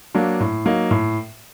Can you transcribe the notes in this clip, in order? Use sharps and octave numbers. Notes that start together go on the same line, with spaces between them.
F#3 A#3 D4
A2
F#3 A#3 D#4
A2